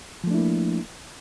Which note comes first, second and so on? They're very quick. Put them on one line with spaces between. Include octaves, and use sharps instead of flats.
F3 A3 D4 E4 A#3